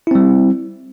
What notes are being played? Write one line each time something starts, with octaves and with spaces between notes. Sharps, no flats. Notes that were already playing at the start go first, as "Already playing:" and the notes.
G3 C4 E4